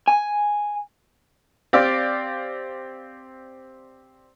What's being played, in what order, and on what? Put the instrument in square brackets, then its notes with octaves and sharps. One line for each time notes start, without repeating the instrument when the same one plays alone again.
[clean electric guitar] G#5
[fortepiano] C4 G4 D5 F5